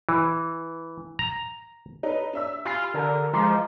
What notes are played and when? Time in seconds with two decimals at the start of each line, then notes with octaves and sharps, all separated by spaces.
0.09 E3
1.19 A#5
2.03 D#4 A4 B4 C#5
2.33 D4 E5 E6
2.65 F4 G4 G#5 B5
2.94 D3 A#4
3.33 F3 G#3 A#5 C6 D6